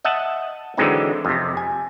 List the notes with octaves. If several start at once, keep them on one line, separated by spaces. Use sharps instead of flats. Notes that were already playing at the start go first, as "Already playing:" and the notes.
D#5 E5 F#5 A5
D3 E3 F#3 G#3 C4 D#4
F2 C3
G#5